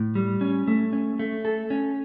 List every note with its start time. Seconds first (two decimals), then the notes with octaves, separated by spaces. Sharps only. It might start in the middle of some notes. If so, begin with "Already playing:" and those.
Already playing: A2
0.15 G3
0.41 C#4
0.68 A3
0.93 C#4
1.19 A3
1.45 A4
1.70 C#4